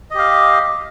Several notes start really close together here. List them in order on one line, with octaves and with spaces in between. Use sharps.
D#5 G4 F5